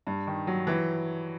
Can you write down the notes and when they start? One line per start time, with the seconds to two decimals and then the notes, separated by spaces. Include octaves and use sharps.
0.07 G2
0.27 D#3
0.47 F#3
0.67 E3